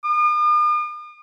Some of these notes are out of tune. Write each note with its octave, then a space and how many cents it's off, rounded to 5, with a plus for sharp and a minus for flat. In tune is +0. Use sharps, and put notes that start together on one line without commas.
D#6 -45